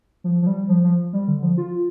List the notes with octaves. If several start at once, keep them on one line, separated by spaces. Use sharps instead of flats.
F3
F3
G3
F3
F3
G3
D3
F3
F4